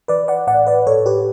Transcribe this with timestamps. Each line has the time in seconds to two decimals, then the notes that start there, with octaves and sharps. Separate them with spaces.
0.08 E3 B4 D5
0.28 D5 F#5
0.47 A2 D5 F#5
0.67 B4 D5
0.87 A2 A4 C#5
1.06 G4 B4